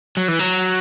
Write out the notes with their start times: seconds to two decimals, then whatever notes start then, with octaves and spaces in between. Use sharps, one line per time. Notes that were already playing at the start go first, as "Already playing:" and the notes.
0.17 F#3
0.28 E3
0.40 F#3